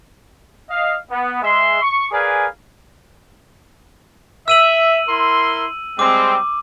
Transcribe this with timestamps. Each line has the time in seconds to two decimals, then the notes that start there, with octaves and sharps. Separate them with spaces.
0.70 D#5 F5
1.10 B3
1.42 G#3 E5 C6
1.82 C#6
2.12 G#4 A#4 B4 D5 F5 G#5
4.48 E5 E6 D#7 F#7
5.09 E4 A#4 C6
5.99 G3 G#3 C4 D6